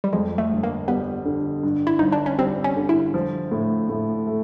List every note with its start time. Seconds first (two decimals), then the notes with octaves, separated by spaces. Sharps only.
0.04 G3
0.13 F2 G#3
0.38 A3
0.51 G1
0.63 A#3
0.88 G3 B3
1.25 D3
1.63 G2
1.87 E4
1.99 G1 D#4
2.12 D4
2.26 C#4
2.38 G3 C4
2.64 C#4
2.76 D3
2.89 E4
3.14 F3
3.51 A2
3.89 A2
4.27 A3